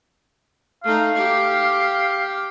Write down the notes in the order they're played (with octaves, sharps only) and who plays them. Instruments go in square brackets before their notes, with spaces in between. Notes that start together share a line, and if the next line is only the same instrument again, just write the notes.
[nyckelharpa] A3 D#4 [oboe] F5
[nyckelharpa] G4